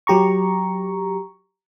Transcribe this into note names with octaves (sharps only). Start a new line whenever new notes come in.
F#3 G4 A#5 C#6